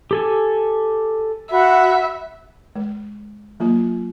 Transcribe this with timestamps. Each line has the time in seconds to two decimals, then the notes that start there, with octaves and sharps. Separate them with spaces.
0.11 G4 A4 G#5
1.51 F#4 E5 F#5 B5
2.76 G#3
3.60 F#3 A#3 F4